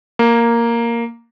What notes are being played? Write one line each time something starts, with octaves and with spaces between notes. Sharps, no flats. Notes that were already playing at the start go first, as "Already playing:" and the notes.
A#3